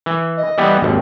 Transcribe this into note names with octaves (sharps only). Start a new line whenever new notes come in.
E3
D#5
E3 G3 B3
G#1 D#2